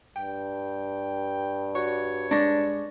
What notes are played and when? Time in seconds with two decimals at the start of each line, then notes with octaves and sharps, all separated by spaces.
0.16 G2 G5
1.76 F#4 C#5 D5
2.31 G#3 D4 C#6 A#6